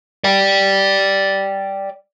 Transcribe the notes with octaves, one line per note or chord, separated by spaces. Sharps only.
D5 G5